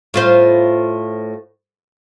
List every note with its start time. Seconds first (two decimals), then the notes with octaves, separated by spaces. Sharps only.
0.14 A2 F4 C5